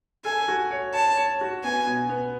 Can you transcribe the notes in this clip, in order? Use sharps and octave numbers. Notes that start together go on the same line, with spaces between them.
A4 G#5
F#4
C#5
C#5 A5
C#5
F#4
B3 G#5
B2
B3